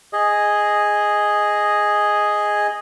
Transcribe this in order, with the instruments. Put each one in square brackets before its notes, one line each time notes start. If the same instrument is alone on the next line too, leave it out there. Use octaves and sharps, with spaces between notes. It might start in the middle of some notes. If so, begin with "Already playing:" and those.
[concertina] G#4 D#5